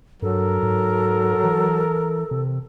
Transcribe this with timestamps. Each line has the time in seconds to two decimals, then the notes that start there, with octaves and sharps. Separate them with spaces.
0.22 G2 F#3 A4 A#4
0.63 G#2
1.43 E3
2.31 C3